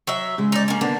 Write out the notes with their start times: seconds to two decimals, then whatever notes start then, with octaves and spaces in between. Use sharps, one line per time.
0.07 F#3 E5
0.38 C#3 G#3
0.52 D#4 D5
0.68 A#3 C#4
0.81 D3 A#3 B3 D4